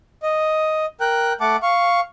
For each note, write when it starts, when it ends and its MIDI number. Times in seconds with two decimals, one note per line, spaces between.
0.23 0.86 75
1.00 1.33 70
1.00 1.33 79
1.00 1.33 90
1.41 1.56 57
1.41 1.56 78
1.41 1.56 81
1.41 1.56 86
1.63 2.01 77
1.63 2.01 85